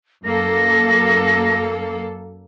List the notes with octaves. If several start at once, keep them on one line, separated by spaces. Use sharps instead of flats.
F#2 A#3 A4 A#6